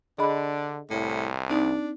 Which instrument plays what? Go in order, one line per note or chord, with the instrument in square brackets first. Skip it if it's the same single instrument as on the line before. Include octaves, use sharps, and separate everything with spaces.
[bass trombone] D3 [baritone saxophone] D4 [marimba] G#4 D#5 B5
[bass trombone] C2 [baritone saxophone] A2
[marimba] C4 D#4 [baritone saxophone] D4